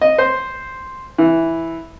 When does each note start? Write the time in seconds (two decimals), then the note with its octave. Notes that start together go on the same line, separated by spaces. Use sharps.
0.01 D#5
0.18 C5
1.18 E3